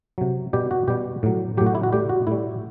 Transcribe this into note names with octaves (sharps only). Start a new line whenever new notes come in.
C3 F#3
B2 G3 G4
F#4
B2 G3 G4
A2 F#3
A2 F#3 G4
F#4
E4
F#4
A2 G3 G4
F#4
A2 G3 E4